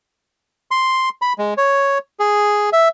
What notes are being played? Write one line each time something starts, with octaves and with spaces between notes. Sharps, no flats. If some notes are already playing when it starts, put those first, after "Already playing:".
C6
B5
G#3
C#5
G#4
E5